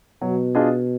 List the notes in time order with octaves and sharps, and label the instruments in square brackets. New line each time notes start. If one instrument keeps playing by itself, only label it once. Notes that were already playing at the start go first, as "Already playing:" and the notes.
[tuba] B2 [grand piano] F#3
[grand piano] D4 F4 G#4 D#5